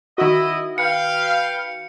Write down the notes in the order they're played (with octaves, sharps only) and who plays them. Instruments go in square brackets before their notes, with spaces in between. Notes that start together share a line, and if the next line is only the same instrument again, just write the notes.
[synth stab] D#3 F#4 [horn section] E4 D#5
[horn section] B4 F5 G5 [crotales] C#7